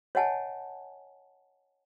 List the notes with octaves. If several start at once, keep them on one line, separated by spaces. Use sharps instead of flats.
C#5 D#5 F#5 G#5 A5